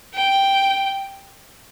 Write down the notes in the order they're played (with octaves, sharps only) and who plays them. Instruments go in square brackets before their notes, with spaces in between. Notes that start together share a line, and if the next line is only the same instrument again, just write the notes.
[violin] G5